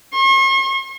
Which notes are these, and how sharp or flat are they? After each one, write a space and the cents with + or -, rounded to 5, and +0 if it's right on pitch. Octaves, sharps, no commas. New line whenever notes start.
C#6 -45